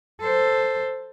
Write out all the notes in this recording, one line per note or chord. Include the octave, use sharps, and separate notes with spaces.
A4 C5